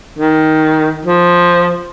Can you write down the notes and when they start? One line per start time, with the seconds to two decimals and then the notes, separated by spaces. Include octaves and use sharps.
0.19 D#3
1.05 F3